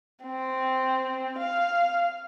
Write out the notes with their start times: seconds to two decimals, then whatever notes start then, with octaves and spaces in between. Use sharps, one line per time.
0.24 C4
1.39 F5